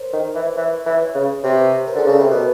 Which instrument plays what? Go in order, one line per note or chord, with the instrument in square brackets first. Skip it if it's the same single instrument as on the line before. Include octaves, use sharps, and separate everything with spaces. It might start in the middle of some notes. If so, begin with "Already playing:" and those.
Already playing: [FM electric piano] A#4 C5 C#5
[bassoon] D#3
E3
[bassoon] E3 [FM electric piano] B4 C#5
[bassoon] E3
[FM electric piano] B4 C#5
[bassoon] C#3
[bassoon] C3 [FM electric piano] B4 C#5
[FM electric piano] A#4 C5
[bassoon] D3 [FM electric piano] G#4
[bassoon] C#3 [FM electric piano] A4
[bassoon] C3 [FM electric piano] A#4
[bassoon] B2 [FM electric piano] A4 B4